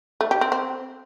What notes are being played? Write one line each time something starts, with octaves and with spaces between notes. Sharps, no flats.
A3
G4
C4
C4